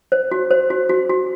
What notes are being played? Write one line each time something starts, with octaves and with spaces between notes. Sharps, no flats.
C5
F#4
C5
F#4
F#4
F#4